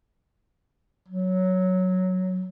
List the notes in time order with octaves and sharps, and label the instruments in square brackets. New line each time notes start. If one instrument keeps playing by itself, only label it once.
[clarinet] F#3